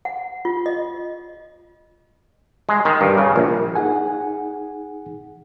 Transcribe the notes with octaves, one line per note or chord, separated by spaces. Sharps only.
F#5
F4
D#5
G#3
D#3
G2
C#3
A#1
D#4 G#4 F#5 G#5